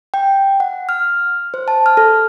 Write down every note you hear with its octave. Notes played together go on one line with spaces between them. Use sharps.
G5
F#5
F6
C5
A5
F6
A4